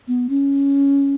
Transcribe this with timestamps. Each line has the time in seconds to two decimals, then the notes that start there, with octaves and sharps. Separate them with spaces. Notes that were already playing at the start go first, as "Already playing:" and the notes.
0.08 B3
0.29 C#4